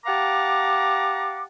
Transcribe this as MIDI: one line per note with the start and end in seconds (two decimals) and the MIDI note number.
0.06 1.44 67
0.06 1.44 77
0.06 1.44 78
0.06 1.44 81
0.06 1.44 82
0.06 1.44 86